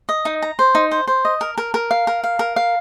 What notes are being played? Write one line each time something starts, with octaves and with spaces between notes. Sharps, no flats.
D#5
D#4
A#5
C5
D#4
C5
C5
D#5
A#4
A#4
A#4
F5
A#4
F5
A#4
F5